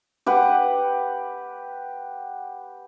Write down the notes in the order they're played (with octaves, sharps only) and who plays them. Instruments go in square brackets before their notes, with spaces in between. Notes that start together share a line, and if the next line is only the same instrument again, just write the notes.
[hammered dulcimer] G4 B4 F#5